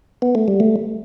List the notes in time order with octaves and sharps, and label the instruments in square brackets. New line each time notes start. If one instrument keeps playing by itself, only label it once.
[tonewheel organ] B3
A3
G3
A3